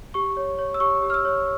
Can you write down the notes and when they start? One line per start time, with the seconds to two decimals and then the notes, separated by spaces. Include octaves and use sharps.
0.14 G4 C#6
0.37 C#5
0.59 C#5
0.74 E6
0.80 G4 C#6
1.02 G4
1.10 F6
1.14 E6
1.25 C#5